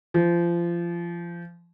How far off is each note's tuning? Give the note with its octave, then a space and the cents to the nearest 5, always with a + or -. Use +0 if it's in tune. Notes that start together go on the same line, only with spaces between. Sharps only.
F3 -25